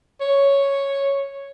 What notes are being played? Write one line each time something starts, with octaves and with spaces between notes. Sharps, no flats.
C#5